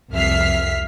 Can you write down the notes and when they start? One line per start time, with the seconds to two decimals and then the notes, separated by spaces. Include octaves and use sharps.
0.12 C2 F2 E5 F6 B6 C7